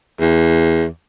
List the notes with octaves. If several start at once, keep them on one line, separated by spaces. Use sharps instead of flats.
E2